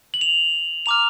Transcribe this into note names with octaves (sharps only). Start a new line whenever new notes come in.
F#7
F7
A#5 D6 F6 F7